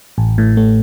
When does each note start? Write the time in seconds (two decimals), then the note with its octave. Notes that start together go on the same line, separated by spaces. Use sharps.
0.18 A1
0.38 A2
0.57 A3